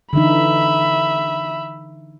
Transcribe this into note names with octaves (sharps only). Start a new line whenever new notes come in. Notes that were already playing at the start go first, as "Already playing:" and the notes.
D3 E3 D#4 E5 B5